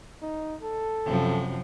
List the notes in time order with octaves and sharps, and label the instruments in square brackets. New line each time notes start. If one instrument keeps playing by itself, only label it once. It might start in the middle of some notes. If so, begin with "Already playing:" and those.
[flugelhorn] D#4
A4
[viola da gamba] F#2 C3 F3